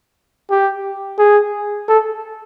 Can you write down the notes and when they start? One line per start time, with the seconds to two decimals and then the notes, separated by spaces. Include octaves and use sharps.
0.50 G4
1.19 G#4
1.88 A4